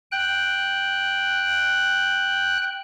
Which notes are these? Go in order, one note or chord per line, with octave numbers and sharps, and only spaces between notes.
G5 F#6